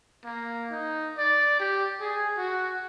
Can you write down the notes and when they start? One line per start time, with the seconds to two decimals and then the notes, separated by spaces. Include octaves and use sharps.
0.24 A#3
0.71 D#4
1.18 D5
1.59 G4
2.01 G#4
2.37 F#4